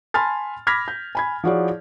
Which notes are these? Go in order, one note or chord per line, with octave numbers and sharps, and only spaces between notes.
G#5 A5 B5 C6 F6 A6
B5 D6 F6 G#6 A#6 B6
G6
G#5 B5 G#6
F3 E4 F#4 G#4 C#5 D5